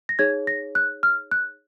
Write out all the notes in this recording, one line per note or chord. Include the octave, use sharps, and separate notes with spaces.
A#6
D#4 G#4 C#5 G#6
A#6
F#6
F6
F#6